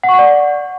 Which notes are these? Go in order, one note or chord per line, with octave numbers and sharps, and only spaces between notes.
F#5
C#6
F#5
D5